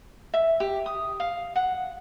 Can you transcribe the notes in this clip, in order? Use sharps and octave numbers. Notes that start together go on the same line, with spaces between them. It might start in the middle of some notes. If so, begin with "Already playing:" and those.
E5
G4
D#6
F5
F#5